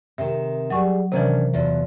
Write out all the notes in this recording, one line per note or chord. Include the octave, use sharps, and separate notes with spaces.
C3 D#3 E5
F#3 G3 G#4 C#6
C3 D#3 E3 C#4 D4
E2 B2 F4